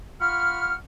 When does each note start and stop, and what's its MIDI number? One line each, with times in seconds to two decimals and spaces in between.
0.21 0.76 65
0.21 0.76 78
0.21 0.76 83
0.21 0.76 85
0.21 0.76 89